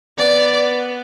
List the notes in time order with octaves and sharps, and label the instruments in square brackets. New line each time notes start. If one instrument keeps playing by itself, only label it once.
[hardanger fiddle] B3 [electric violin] D5